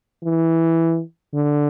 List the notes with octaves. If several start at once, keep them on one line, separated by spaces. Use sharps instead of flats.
E3
D3